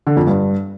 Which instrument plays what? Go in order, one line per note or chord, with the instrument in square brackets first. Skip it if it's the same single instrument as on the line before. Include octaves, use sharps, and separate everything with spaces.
[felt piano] D3
F2
G2